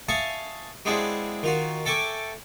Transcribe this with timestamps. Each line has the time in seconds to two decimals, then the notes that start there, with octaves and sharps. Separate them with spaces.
0.09 E5 F5 G#5 A5 C#6 D#6
0.85 G#3 B3 C4 D4 E4 G#4
1.43 D#3 F4 F#4
1.86 A4 E5 G5 G#5 C#6 D6